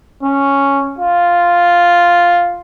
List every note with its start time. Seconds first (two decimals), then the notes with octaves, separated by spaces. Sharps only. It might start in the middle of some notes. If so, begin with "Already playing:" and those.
0.23 C#4
0.99 F4